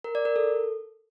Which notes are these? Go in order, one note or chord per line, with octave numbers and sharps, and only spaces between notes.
A#4
D5
A#4
A4